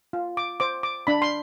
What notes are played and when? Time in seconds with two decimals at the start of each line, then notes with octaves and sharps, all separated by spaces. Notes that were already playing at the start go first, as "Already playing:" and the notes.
0.13 F4
0.37 D6
0.60 C5 D6
0.83 D6
1.07 D4 B5
1.22 C6